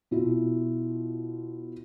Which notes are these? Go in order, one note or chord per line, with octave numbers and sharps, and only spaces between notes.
B2 E4 F4